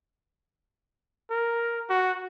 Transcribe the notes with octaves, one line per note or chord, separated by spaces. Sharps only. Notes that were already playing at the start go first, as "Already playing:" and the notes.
A#4
F#4